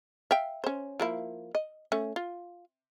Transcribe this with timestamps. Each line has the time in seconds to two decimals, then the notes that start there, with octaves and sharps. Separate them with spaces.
0.31 E5 F5 G5
0.64 C#4 C5
1.00 F3 A#3 E4
1.55 D#5
1.92 A3 C#4
2.16 F4